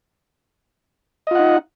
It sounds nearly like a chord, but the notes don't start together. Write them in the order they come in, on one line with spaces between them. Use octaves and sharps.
D#5 F4 F#5 D#4